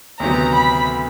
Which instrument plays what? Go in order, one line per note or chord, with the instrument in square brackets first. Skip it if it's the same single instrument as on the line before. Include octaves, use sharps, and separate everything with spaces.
[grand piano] D2 C3 D#3 F#3 B3 [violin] A#5
[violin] B5